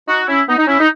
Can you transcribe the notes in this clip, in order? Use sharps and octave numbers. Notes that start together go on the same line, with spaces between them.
D#4 F#4
C#4 E4
B3 D#4
D#4
C#4 E4
D#4